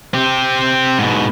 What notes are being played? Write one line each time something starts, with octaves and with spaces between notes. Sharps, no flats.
C4 G4
G#2 B2